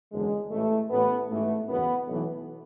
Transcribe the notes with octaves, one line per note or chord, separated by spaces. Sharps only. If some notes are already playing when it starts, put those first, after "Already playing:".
F#1 E2 D3 G#3
A1 A2 E3 A3
A1 A2 E3 B3
A1 G#2 E3 A3
F#1 E2 B2 B3
B1 A2 E3